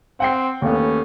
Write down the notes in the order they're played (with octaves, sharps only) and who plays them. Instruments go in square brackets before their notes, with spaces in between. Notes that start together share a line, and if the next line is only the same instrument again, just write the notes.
[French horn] C4 [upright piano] F#5 G5 C7
[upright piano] D#2 A3 B3 [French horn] C#4